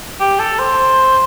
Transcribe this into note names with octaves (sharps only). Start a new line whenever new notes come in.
G4
A4
C5